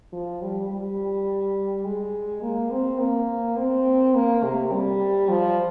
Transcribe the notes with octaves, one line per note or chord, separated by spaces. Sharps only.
F3
G3
G3
G#3
A#3
C4
A#3
C4
A#3
C3
G3
F3